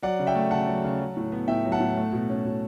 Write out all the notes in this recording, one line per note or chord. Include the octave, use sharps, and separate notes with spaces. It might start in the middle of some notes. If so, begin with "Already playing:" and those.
F#3 D5 F#5
C#3
E5 G5
A3
C#3 F#5 A5
F#3
C#3
F#3
A2
B3
A2 E5 G5
F#3
F#5 A5
A2
A3
B2
C#4
B2